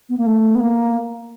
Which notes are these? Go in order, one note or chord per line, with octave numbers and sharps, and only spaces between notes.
B3
A#3
A3
B3
A#3